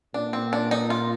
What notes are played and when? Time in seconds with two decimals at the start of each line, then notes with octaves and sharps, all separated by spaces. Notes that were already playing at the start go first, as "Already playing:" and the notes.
0.14 A#2 D4
0.33 C4
0.53 D4
0.71 D#4
0.90 F4